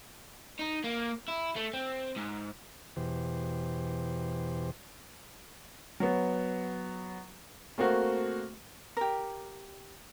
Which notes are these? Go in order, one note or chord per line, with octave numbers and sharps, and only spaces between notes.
D#4
A#3
E4
A3
C4
G#2
E2 B2 E3 G4 C5
F#3 B3
A3 A#3 C4 F#4
G4 A#4